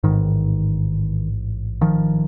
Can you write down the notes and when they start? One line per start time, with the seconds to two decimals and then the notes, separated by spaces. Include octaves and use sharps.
0.04 A1 G#2 D#3
1.81 D#3 F3